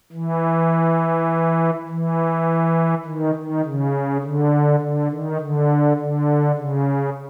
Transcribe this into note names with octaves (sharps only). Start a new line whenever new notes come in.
E3
E3
D#3
D#3
C#3
D3
D3
D#3
D3
D3
C#3